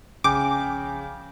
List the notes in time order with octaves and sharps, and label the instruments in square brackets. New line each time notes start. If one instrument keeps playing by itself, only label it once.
[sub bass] A#1 [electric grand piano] C#3 [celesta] G5 G#5 G6 [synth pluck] D6